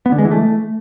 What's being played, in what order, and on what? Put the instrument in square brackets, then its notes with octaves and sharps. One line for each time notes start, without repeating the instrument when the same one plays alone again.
[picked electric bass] B3
D3
G#3
E3
A3